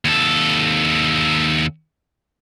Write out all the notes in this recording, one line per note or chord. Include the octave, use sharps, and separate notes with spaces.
D#2 A4